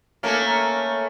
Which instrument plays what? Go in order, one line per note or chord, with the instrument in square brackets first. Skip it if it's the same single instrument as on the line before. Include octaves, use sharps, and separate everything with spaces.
[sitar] A3 A#3 C#4